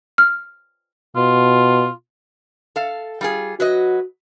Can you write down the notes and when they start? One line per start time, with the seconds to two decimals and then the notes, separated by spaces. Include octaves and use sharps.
0.18 F6
1.16 B2 F4
2.76 A4 F5
3.21 G3 F4 G#4
3.60 F#3 F#4 B4 D#5